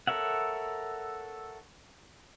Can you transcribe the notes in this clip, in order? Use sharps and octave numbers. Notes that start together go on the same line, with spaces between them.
A4 A#4 C#5 E5 F#5